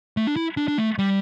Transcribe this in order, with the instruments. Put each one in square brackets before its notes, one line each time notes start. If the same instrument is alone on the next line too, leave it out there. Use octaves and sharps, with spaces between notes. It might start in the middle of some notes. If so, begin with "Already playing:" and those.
[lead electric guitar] A3
D4
E4
D4
D4
A3
G3